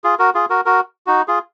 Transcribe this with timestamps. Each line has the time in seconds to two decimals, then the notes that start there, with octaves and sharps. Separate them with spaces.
0.04 F4 G#4
0.19 F#4 A#4
0.35 F4 G#4
0.50 F#4 A#4
0.66 F#4 A#4
1.07 D#4 F#4
1.28 F4 G#4